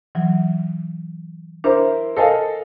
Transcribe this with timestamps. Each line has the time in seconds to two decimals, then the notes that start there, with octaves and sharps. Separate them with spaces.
0.15 E3 F#3
1.64 D4 E4 A#4 C5
2.17 A4 A#4 C5 D#5 F5 G#5